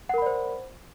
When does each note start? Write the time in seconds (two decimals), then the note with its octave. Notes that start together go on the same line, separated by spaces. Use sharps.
0.09 F#5
0.14 A#4
0.18 B5
0.22 D5
0.26 C5